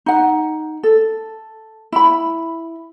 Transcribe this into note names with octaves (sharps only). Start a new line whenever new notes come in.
D#4 F#5
A4
E4 B5